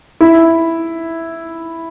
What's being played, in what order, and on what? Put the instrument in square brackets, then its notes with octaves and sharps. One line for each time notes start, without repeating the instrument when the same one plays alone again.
[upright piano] E4